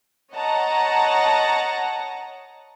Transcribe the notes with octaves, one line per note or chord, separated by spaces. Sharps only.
C#5 D#5 F#5 A5 A#5